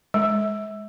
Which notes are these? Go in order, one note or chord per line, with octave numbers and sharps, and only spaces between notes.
G#3